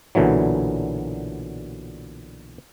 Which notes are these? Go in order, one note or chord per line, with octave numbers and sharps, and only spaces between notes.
B1 A#2 D3 E3 F#3